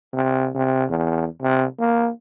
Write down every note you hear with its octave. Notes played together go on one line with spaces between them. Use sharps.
C3
C3
E2
C3
A#3